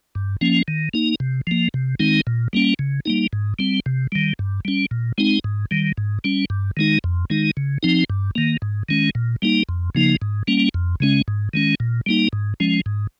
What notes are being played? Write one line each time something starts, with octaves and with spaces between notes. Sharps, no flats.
G2
F3 A#3 C#4
D#3
A#3 D#4
C3
F3 A#3
C3
D#3 G#3 C4 D#4
A#2
G3 A#3 C#4
C#3
G3 A#3 D#4
G#2
G3 C4
C3
D#3 G3
G2
G3 C#4
A#2
G#3 C4 D#4
G#2
D#3 G3
G#2
G3 C#4
G2
D#3 G#3 D#4
F2
D#3 G#3 D#4
C#3
F3 C4 D#4
G2
D#3 A#3
G#2
D#3 G#3 C#4
A#2
G3 A#3 D#4
F2
C#3 F3 A#3 D#4
G#2
G3 A#3 C#4
F2
C#3 G#3 C#4
G#2
D#3 G#3 C#4
A#2
G3 A#3 D#4
G#2
F3 G#3 C#4
G#2